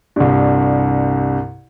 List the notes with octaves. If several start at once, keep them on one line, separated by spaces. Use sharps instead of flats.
C2 G2